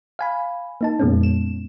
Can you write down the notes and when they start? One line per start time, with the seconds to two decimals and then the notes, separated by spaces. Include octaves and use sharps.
0.19 F5 G#5 B5
0.81 A#3 D#4 A5
0.99 F2 A#2 G#3 A#3 B3 C#4
1.23 E7